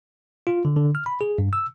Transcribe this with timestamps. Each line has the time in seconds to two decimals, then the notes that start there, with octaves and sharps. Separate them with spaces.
0.47 F4
0.65 D3
0.76 D3
0.95 F6
1.06 B5
1.21 G#4
1.38 G2
1.53 E6